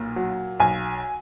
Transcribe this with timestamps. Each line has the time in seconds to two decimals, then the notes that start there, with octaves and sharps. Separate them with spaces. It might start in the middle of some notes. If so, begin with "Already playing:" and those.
Already playing: B1 A#2
0.16 F#3
0.60 B1 G#5